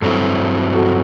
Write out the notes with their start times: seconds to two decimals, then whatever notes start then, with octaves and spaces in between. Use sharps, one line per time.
0.01 G2 F#3 C4 E4 F#4 A4
0.74 F#4 A4